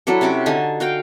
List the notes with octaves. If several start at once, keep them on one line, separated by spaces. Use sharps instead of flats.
F#3 D4 E4 A4
C3 C#4 F#4 D6
D3 D#4 G#5 A5
F#4 F5 G5